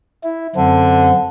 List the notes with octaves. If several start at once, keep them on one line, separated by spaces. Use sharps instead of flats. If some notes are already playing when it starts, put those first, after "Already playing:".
E4
F#2 D3 C4